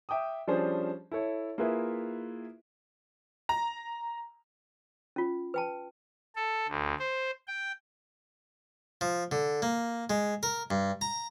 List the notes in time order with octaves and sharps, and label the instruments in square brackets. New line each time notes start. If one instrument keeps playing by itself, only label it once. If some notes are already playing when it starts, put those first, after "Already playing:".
[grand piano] E5 G5 D6 D#6
F3 G3 C#4 D4 G#4 C5
E4 A4 C#5
A#3 E4 F4 G#4 B4 E5
[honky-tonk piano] A#5
[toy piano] C#4 F4
B4 G5 A5
[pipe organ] A4
D2
C5
G5
[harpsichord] F3
D3
A#3
G#3
A#4
G2
A#5